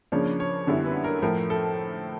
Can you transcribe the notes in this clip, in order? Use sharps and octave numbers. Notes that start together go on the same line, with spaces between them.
C#3 F3 A#3 D4 C#5
C#5
F#2 D3 G3 B3 E4
B4
A#4
A2 F3 A3 A#4
A4